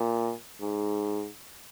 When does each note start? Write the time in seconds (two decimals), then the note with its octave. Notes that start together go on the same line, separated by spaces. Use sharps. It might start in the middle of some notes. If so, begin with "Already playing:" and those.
Already playing: A#2
0.62 G#2